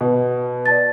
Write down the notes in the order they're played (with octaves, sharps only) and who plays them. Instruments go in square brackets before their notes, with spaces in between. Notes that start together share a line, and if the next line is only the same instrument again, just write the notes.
[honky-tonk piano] B2
[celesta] D5 A5 A6